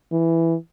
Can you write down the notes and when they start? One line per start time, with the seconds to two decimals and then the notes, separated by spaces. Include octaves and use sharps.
0.12 E3